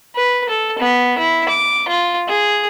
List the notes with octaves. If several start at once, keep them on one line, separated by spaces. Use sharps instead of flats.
B4
A4
B3
E4
D6
F4
G#4